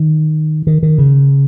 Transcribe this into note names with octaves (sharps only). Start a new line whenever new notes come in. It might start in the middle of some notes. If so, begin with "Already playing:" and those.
Already playing: D#3
D#3
D#3
C#3